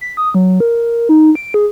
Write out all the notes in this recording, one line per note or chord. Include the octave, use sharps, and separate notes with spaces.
B6
D#6
F#3
A#4
D#4
D7
G#4